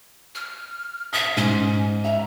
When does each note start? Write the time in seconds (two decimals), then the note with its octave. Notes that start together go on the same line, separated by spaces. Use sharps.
0.35 F6
1.13 E5 D#6
1.37 G#2 C#4
2.04 E5 A#5